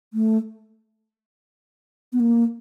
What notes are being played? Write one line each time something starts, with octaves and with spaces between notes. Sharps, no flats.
A3
B3
A#3